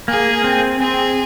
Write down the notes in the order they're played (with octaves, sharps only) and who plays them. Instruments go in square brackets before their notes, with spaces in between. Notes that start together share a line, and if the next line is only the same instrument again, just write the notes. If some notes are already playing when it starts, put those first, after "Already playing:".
[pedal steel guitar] A#3 [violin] G#4
[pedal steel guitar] C4
[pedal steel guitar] C4 [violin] G#4